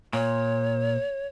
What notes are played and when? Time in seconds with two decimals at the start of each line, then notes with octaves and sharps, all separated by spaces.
0.13 A#2 C#5